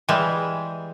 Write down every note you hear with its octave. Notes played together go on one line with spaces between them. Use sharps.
E3 G3 G#3